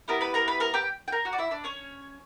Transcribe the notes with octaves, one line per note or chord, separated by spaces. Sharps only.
B3 E4 G4 A#4 A#5
B4 B5
A#4 A#5
B4 B5
A#4 A#5
G4 G5
G5
A#4 A#5
F#4 F#5
D5
E4 E5
D4 D5
C#4 C#5